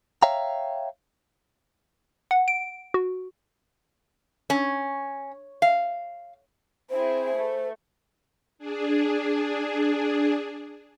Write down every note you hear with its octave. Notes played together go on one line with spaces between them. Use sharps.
C#5 E5 F5 G5 A#5
F#5
D7
F#4
C#4
F5
C4 E4 G#4 C5
A3
D4 G#4